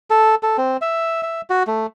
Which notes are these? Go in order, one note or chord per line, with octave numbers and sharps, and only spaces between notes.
A4
A4
C4
E5
E5
F#4
A3